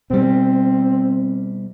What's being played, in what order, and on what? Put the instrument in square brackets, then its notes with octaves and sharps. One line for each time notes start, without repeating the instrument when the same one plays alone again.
[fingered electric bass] B2 G3 [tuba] C4